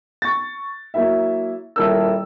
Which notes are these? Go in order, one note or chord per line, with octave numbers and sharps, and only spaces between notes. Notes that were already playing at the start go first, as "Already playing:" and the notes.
C#6 A6
F#3 A#3 E4 E5
D#1 E4 A4 A#4 E6